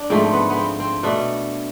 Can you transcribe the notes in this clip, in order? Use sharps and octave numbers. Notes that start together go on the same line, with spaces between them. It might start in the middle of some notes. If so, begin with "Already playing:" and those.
Already playing: D4
G#2 F3 A3 C4
B3
B3
C4
C4
B2 A3 D4